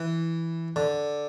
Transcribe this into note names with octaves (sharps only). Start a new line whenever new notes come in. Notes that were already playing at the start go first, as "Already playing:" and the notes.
Already playing: E3
D3